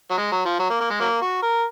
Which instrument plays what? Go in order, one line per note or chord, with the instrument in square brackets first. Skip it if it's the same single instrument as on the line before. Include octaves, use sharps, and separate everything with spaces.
[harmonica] F#3
G#3
F#3
F3
F#3
A#3
A#3
G#3
F#3 A#3
F#4
A#4